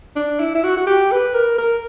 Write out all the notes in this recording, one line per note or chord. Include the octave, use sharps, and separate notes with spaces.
D4
E4
E4
F#4
F#4
G4
B4
A#4
A#4